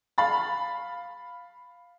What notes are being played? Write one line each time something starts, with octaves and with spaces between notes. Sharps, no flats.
F5 B5 A6